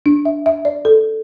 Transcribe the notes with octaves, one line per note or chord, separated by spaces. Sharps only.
D4
E5
E5
D5
A4